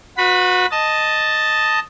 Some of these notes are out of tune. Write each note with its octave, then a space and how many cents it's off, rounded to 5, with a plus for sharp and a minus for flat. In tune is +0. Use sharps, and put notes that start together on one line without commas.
F#4 -30 B4 +0 B5 +0
D#5 +0 A5 +0